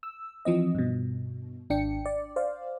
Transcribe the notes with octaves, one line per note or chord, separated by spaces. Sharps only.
E6
E3 F3 C4 D#5
G2 B2
G#1 D4 G5 C#7
D5
C5 D5 F5